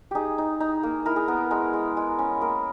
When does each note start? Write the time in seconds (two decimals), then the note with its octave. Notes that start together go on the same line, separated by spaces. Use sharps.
0.11 D#4 G4 G#4
0.38 D#4
0.60 D#4
0.83 A#3
1.06 E4 A#4
1.16 G#4
1.28 B3 A#4
1.51 G#3 A#4
1.73 G#3
1.97 G#3
2.19 C#4
2.41 A#3 A#4